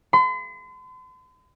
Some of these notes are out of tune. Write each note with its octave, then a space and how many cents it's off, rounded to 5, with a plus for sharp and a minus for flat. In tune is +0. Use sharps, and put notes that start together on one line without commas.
C6 -45